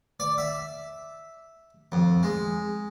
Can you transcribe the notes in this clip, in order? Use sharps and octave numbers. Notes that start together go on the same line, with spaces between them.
D5
E5
F2
G#3